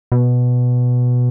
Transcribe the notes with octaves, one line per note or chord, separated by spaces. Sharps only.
B2